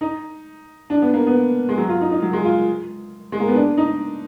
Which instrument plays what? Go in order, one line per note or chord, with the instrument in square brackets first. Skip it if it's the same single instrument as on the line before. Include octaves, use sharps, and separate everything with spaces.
[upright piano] D#4
D4
B3
A#3
B3
G#3
F#3
F4
D#4
D#4
F#3
G#3
F4
G#3
A#3
B3
D4
D#4